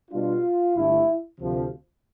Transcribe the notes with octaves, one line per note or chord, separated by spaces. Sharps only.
B2 G3 D4 F4
G1 G2 D3 A3 E4
D2 C3 F3